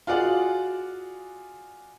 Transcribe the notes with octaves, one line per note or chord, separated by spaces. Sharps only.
F4 F#4 G#4 D5 F#5